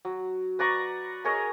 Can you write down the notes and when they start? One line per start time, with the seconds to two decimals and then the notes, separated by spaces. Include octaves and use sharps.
0.05 F#3
0.59 B4 D5 A#5 C#6
1.24 G#4 A#4 C#5 D#5